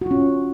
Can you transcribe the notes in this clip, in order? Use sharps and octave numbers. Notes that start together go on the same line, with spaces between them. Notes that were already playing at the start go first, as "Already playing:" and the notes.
C#4 F4 F#4